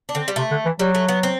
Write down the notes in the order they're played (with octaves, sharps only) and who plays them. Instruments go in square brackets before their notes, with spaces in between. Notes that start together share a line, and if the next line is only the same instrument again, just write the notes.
[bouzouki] D4
[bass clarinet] D3 [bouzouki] C4
[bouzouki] G3
[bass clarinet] C3 [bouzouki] A3
[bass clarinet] D3
E3
[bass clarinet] F#3 [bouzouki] G3
[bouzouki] A3
B3
C4